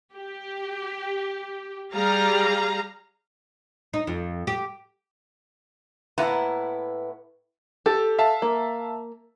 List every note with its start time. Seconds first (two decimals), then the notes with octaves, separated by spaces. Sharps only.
0.14 G4
1.92 G3 G#4 F5 A#5
3.94 D#4
4.07 F2
4.47 G4
6.18 A2 A#3 B3 E4 B4 A#5
7.86 G4 A4
8.19 E5 F5 A5
8.42 A#3